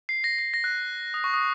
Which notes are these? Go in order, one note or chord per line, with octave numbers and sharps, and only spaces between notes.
C7
A#6
C7
A#6
F#6
D#6
C#6
D#6